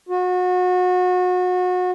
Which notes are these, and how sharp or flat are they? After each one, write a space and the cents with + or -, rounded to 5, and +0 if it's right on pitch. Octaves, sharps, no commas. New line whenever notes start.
F#4 -30